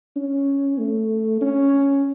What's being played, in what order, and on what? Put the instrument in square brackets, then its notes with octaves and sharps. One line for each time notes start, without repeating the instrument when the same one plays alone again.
[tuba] C#4
A3
C#4